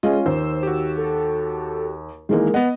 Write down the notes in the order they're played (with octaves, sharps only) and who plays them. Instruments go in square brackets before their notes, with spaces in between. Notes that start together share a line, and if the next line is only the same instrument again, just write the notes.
[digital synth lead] G#3 [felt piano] C#4 F4 [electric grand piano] D#5
[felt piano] D#2 [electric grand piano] C5 [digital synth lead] E6
[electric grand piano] F#4 G4
[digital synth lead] A4
[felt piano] D#3 E3 A#3 [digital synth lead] G#3
[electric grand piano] B3 F#5 [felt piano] D#5